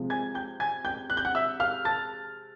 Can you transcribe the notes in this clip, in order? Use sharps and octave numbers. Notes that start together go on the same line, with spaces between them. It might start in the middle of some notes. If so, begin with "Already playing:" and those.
Already playing: C3 F3 G#3
G#5 G#6
G5 G6
G#5 G#6
G5 G6
F#6
G6
F#5 F#6
E5 E6
F5 F6
A5 A6